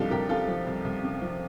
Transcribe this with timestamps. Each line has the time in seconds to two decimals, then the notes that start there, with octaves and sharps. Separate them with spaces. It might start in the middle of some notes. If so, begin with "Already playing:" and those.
Already playing: C2 F3 D4 D#4 F4 G4 A4
0.11 C2 G4 A#4
0.29 C3 F4 A4
0.48 F3
0.67 C2
0.84 C2
1.03 C3
1.22 F3